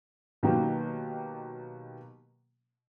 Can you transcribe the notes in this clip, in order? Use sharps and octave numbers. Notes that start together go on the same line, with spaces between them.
B2 D#3 F#3 A#3 G4